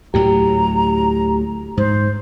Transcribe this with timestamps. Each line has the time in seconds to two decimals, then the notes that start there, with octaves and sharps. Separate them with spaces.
0.14 D2 A2 F#3 G4 A#5
1.77 G#2 C5